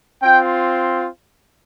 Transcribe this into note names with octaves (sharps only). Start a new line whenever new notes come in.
C4 F4 G5